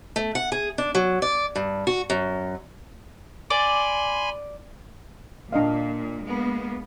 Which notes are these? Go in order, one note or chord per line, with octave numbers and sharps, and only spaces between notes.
A3
F#5
G#4
D4
F#3
D5
G2
F#4
F#2
D5 G#5 B5 C6
A#2 D4 D#5 F5
G#3 A#3 B3